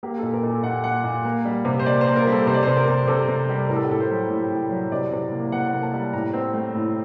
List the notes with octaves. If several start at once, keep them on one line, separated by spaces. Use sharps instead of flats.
A#3 G4
A#2 A4
A#4
A#2
A4
A#2 F#5
A#2 F#5
A#2
A#3
G3
C3
C5
A#3 D5
C5
A#3
A#4
G3 A4
C3 C5
D5
C3 C5
A#4
C3
C3 A4
C3
G3
A2 A#4
A4
G4
A2 A4
C5
F#3
A2
A2
F#3
C3 D5
C3
A#3
C3 F#5
F#5
A#3
A5
G3
A2 A#5
C4
A3
A2